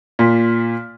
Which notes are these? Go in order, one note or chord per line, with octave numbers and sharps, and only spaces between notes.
A#2